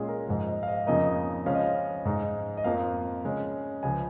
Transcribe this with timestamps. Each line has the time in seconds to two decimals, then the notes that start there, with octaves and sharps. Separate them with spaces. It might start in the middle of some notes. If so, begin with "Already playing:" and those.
Already playing: A#2 G#3 C#4 G#4
0.08 A#4
0.28 G#2 F3 G#3
0.48 D#5
0.63 F5
0.68 D#5
0.87 F2 C#3 F3 A#3 D#4 D#5
1.46 C#3 F3 G#3 C#4 F5
1.55 D#5
1.64 F5
2.05 G#2 G#3 D#4
2.57 D#5
2.64 F2 F3 A#3 F5
3.24 C#3 G#3 C#4
3.83 C#2 C#3 F3 G#5